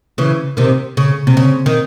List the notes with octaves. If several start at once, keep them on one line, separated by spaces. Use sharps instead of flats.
C#3 E3
C3 D#3
C#3
C3
C#3
D#3